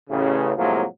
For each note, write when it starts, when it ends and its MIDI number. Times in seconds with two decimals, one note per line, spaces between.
0.10 0.53 33
0.10 0.53 49
0.57 0.84 45
0.57 0.84 48
0.57 0.84 53
0.57 0.84 54
0.57 0.84 56
0.57 0.84 58